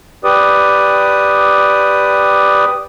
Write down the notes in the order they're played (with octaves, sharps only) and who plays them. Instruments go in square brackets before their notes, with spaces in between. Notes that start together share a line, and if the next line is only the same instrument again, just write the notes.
[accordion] G4 B4 D5 D#6